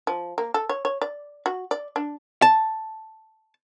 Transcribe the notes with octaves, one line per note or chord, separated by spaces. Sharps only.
F3
A#3
A4
C#5
C#5
D5
F#4
D5
D4
A5